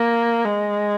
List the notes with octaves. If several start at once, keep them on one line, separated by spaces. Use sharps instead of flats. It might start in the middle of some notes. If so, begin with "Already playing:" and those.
Already playing: A#3
G#3